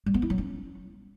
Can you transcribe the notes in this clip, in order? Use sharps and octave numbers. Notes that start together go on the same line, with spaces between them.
G3
B3
E4
F#3
C#4